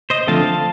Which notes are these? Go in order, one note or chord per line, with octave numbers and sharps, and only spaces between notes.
C5 D#5
D3 F3 A3 C4 F5 A5